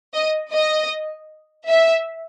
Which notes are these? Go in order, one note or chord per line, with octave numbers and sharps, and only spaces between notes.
D#5
D#5
E5